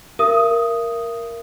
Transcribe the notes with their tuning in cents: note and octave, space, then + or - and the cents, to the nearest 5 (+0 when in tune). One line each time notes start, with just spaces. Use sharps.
A#4 +0 E5 +40 D#6 +0